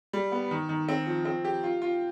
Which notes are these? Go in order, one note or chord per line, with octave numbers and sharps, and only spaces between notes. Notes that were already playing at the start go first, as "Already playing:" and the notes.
G3
B3
D#3
D#3
C4
F3
C4
G4
F4
F4